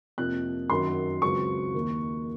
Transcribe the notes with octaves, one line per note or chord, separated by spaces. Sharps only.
F2 C3 F3 A#3 F#6
F#2 D#3 F#3 C6
C#2 C#3 F#3 C4 C#6
D#2 D#3 A#3